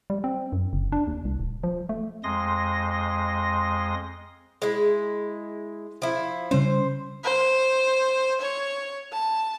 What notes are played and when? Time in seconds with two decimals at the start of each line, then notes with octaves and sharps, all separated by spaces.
0.10 G3
0.24 C4
0.53 F#2
0.73 F#1
0.92 D4
1.08 D#2
1.25 C2
1.40 D#1
1.64 F3
1.89 A3
2.24 F2 G#3 C6 D#6 A#6
4.62 G#3 E4
6.02 F3 E4
6.51 C#3 G3 C#4 C5
7.23 C5
8.41 C#5
9.12 A5